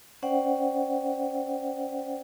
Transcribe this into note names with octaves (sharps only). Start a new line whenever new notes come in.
C#4 C5 D5 F#5 G5